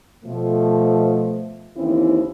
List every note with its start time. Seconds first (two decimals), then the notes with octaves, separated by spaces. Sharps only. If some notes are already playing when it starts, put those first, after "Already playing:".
0.25 B2 F3 A3
1.76 D#2 C#3 E3 C4 E4